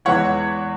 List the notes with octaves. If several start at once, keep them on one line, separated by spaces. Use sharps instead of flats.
E2 E3 G#3 B3 E4 C#5 F#5